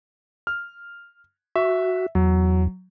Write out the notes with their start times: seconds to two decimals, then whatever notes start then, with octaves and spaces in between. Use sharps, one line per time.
0.47 F6
1.56 F#4 E5
2.15 E2 F#3